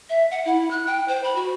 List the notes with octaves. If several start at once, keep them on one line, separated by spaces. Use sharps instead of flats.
E5
F#5
E4
F#6
G5
C5
B5
F#4